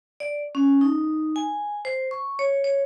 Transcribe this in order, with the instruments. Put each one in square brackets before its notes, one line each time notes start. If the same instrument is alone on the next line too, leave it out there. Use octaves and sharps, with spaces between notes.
[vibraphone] D5
C#4
D#4
G#5
C5
C#6
C#5
C#5